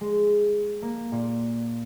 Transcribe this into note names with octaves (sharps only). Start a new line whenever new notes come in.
G#3
A#3
A#2